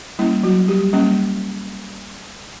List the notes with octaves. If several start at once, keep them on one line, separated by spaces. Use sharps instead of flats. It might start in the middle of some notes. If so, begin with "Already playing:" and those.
G3 A#3 C#4 E4
F#3 F#4
G3 G4
G3 A#3 C#4